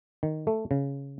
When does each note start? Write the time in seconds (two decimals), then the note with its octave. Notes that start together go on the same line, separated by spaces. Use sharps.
0.23 D#3
0.47 A3
0.71 C#3